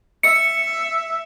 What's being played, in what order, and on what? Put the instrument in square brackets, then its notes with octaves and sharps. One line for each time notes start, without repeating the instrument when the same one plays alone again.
[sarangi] E5 [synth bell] C#7